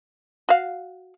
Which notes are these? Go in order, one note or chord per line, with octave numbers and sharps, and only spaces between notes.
F#4 F5